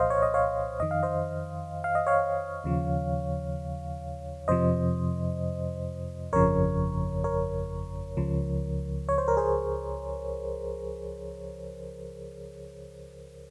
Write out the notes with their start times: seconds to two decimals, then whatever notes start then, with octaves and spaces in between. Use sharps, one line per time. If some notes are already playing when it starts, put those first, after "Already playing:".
Already playing: C2 A#2 F3 C5 D#5 F5
0.10 C#5
0.22 D#5
0.34 C#5 F5
0.80 F2 D#3 D#5
0.91 F5
1.03 C5 D#5
1.84 F5
1.95 D#5
2.06 C#5 F5
2.64 D#2 C#3 F3
4.48 F2 C3 F3 C5 D#5
6.33 G1 F2 C#3 F3 A#4 C#5
7.24 A#4 C#5
8.17 C#2 C#3 F3
9.09 C#5
9.18 C5
9.28 A#4
9.37 G#4 C5